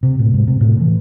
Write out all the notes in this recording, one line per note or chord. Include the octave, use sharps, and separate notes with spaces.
C3
A2
G#2
C3
A2
E3